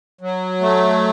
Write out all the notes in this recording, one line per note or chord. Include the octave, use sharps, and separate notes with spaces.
F#3
A3